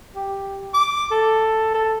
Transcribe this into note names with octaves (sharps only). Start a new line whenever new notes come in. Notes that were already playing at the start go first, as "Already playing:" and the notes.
G4
D6
A4
A4